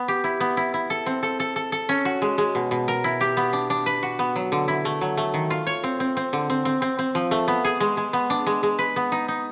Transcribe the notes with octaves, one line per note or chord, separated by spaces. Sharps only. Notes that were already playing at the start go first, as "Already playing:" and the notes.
Already playing: B3
G4
E4
B3
E4
E4
A4
C4
A4
A4
A4
A4
C#4
F#4
G#3
G#3
B2
B2
A#4
E4
G4
B3
D4
D4
B4
F#4
B3
F#3
D3
E4
A3
F#3
A3
D#3
F4
C#5
C4
C4
C4
D3
C4
C4
C4
C4
F3
A3
B3
G#4
G#3
G#3
B3
D4
G#3
G#3
B4
B3
D#4
D#4